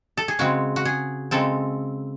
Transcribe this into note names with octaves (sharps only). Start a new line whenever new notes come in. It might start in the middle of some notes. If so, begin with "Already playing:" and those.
A4
G#4
C#3 G#3 C4 F#4
F#4
G#4
C#3 G#3 C4 A4